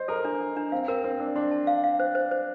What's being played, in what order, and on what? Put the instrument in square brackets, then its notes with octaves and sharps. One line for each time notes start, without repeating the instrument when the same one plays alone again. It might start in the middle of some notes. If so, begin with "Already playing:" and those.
Already playing: [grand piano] C5 D#5
[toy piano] A4 [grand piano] A#4
[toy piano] D4
D4
D4
[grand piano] C4 [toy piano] F5
[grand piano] C4 [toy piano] A#4
[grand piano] C4 [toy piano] A#4
[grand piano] D4 [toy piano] A#4
[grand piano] D4 [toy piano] C6
[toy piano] A5
F5
F5
C5
C5
C5